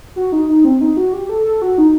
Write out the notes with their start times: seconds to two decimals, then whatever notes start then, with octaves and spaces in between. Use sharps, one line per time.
0.16 F#4
0.32 D#4
0.49 D#4
0.65 C4
0.81 D#4
0.97 F#4
1.13 G4
1.29 A4
1.45 A4
1.62 F#4
1.78 D#4